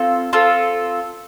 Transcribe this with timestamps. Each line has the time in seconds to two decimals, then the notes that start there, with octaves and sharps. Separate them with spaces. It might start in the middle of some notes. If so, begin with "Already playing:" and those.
Already playing: C4 F4 A4
0.33 C4 F4 A4